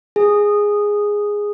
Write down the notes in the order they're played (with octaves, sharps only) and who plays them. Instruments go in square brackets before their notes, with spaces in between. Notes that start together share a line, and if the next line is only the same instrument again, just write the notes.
[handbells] G#4